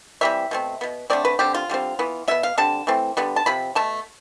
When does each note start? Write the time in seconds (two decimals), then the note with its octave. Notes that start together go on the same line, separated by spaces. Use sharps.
0.21 E3 G3 C4 E5
0.51 B2 A3 C4
0.81 B2 B3
1.10 D3 A3 C4 D5
1.25 B4
1.39 D3 G3 C4 G4
1.54 F4
1.69 D3 G3 C4
1.99 E3 B3
2.28 B2 B3 E5
2.43 F5
2.58 D3 G3 C4 A5
2.87 E3 A3 C4
3.17 D3 G3 B3
3.36 A5
3.46 C3 F3 C4 B5
3.75 B2 A3 A5